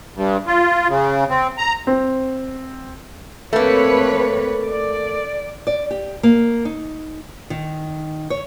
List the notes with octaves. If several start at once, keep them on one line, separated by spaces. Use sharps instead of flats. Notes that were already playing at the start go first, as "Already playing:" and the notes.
G2
F4
C#3
C4
A#5
C4
A3 A#3 C4 B4 C#5
D5
D5
G4
A#3
D#4
D#3
C#5